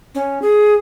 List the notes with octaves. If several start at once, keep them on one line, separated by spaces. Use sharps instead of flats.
C#4
G#4